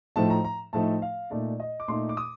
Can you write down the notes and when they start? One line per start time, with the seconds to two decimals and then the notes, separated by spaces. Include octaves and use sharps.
0.16 A2 F3 A3 D#4 A5
0.30 A#5
0.44 A#5
0.73 A2 F3 A3 D#4 A5
1.02 F5
1.30 A#2 A3 D#4 D5
1.60 D#5
1.80 D6
1.88 A#2 A3 D#4 C6
2.09 D6
2.17 D#6